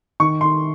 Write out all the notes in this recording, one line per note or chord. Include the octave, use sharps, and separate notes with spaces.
D#3 C#6
D#3 C6